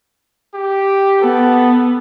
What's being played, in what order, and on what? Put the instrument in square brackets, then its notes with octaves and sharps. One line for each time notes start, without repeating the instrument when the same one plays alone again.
[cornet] G4
[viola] B3 [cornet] A4